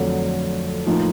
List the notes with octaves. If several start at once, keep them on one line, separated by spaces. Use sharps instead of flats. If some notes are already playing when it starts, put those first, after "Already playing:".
Already playing: F2 D3 F#3 A3
A2 F3 A#3 D#4